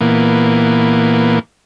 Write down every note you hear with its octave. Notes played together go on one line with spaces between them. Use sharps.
A#2 E3 A#3 B3